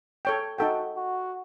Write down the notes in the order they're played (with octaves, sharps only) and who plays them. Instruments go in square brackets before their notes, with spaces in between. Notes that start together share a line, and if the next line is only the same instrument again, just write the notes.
[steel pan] A4 C#5 G5
[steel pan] D#4 A4 G5 [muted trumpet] F#4
[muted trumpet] F#4